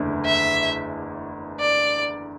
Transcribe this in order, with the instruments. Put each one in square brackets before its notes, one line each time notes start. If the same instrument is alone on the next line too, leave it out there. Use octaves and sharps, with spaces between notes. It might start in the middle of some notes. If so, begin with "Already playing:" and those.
Already playing: [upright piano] F#1 E2 D3 A3
[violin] E5
D5